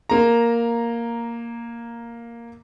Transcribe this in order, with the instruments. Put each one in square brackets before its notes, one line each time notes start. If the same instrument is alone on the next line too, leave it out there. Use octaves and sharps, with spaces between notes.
[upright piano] A#3 A#5